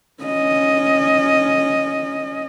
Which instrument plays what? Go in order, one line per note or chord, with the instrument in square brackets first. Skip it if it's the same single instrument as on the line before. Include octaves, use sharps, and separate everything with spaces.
[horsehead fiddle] C#4 D#5